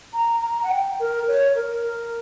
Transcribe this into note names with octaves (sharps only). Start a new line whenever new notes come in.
A#5
A#5
F#5
G5
A#4
C#5
A#4